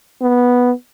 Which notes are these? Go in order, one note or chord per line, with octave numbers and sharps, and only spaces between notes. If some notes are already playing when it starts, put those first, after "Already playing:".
B3